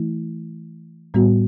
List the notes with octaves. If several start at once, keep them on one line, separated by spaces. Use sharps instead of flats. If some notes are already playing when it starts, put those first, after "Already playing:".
Already playing: E3 A3 E4
A2 G3 B3 F#4